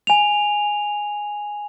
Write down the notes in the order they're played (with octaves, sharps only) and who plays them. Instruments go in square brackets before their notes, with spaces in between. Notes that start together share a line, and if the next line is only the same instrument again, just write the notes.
[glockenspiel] G#5 F7